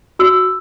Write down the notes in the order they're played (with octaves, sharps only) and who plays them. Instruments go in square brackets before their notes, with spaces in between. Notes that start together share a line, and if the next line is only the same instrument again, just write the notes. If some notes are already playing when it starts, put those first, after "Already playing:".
[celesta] F#4 E6